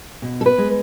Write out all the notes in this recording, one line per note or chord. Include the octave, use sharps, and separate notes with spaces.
B2
A4
B4
G#3